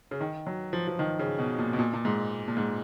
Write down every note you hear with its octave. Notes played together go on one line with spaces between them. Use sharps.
C#3
D#3
F#3
F3
F3
D#3
C#3
B2
A#2
B2
A#2
A#2
G#2
A#2
G#2